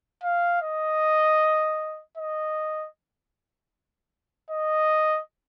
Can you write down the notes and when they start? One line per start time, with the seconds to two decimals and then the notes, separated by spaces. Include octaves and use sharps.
0.23 F5
0.62 D#5
2.17 D#5
4.50 D#5